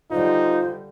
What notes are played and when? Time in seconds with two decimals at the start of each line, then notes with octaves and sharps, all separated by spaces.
0.11 D3 G3 D#4 F4 C5